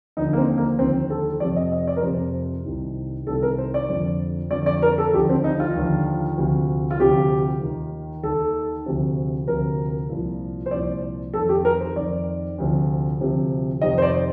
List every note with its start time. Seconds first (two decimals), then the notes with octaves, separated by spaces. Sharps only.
0.17 D#2 D3 F3 D#4
0.33 A#3
0.38 C4
0.58 A#3
0.79 D#2 D3 F3 C4
1.10 A4
1.40 F2 C3 F3 D5
1.56 D#5
1.72 D#5
1.87 D5
1.96 A#4
2.03 F2 C3 F3 C5
2.65 C2 C3 D#3
3.27 C2 C3 D#3 A4
3.43 A#4
3.58 C5
3.74 D5
3.89 F2 D3 F3
4.51 F2 D3 F3 D5
4.66 D5
4.82 A#4
4.98 A4
5.13 D#2 D3 F3 G4
5.29 C4
5.44 D#4
5.60 F4
5.75 D#2 D3 F3
6.37 D2 C3 F3
6.91 F4
6.99 D2 C3 F3 G4
7.62 D#2 D#3
8.23 D#2 D#3 A4
8.86 D2 C3 F3
9.47 D2 C3 F3 A#4
10.10 C2 A#2 F3
10.66 C5
10.71 C2 A#2 F3 D5
11.34 F2 D#3 A4
11.49 G4
11.65 A#4
11.80 C5
11.96 F2 D#3 D5
12.58 D2 C3 F3
13.20 D2 C3 F3
13.81 F2 C3 D#3 D#5
13.98 C5
14.02 D5